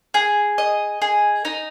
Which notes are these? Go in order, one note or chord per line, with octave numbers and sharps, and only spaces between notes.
G#4
D#5
G#4
D#4